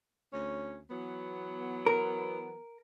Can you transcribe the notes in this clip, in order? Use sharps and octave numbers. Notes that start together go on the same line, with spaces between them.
D2 C#4 C#5
E3 F#3 B3
A#4